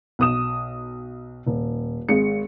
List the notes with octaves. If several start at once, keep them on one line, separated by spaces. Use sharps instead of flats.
B1 D#6 E7
D#1
G#1 G#3 C#7